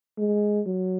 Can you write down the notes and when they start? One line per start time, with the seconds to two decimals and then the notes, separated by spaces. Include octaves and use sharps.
0.18 G#3
0.66 F#3